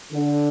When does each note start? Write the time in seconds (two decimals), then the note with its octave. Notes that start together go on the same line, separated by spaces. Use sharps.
0.13 D3